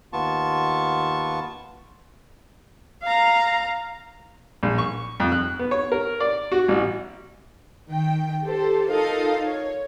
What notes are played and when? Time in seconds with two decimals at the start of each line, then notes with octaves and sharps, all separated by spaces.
0.13 D#2 B3 F4 A5 C#6
3.04 F5 A#5
4.63 A#1
4.78 C#6
5.20 F2
5.32 F#6
5.59 B3
5.71 C#5
5.92 A#4
6.20 D5
6.52 F#4
6.68 A1
7.88 D#3 G5
8.43 G4 A4 C5
8.90 D#4 F4 A4 A#4 D#5 F5
9.45 C#5